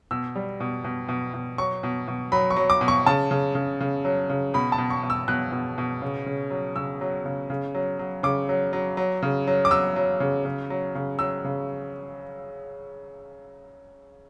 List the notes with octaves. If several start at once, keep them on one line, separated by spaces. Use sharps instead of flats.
B2 E6
G3
B2
B2
B2
B2
F#3 C#6
B2
B2
F#3 B5
C#6
F#3
D6
B2
C#6
C#3 A5
C#3
C#3
C#3
F#3
C#3
B2 B5
A5
B2
C#6
B2
E6
B2 F#6
B2
B2
C#3
C#3
F#3
C#3 E6
F#3
C#3
C#3
F#3
F#3
C#3 D6
F#3
F#3
F#3
C#3
F#3
D6
F#3 E6
F#3
C#3
C#3
F#3
C#3
F#3 E6
C#3